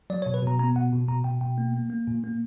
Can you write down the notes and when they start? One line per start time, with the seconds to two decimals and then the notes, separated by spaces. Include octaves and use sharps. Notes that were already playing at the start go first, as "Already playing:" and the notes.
0.10 F#3 D5
0.22 C#5
0.26 B2
0.34 B4
0.43 B2 A#5
0.59 B3 A#5
0.75 B2 F#5
0.93 B2
1.08 B2 A#5
1.24 B2 G5
1.41 B2 G5
1.58 A#3
1.74 A#3
1.90 A#3
2.07 A#2
2.24 A#3